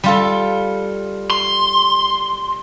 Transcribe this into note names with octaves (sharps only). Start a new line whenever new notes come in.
G3 F4 A4
C6